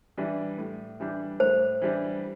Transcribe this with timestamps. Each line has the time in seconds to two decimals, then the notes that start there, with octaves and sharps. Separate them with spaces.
0.18 E3 G3 D4
0.58 A2
1.00 E3 G3 D4
1.40 A2 C5
1.82 E3 G3 D4